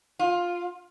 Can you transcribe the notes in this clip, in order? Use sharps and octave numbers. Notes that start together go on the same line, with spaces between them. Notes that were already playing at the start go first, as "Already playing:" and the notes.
F4